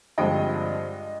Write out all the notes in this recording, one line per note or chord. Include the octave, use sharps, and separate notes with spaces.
G2 D3 F3 G#3 C4 D#5 G5